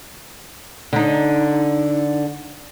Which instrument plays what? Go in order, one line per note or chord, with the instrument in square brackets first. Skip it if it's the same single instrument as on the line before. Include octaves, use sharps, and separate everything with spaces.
[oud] D3 D#4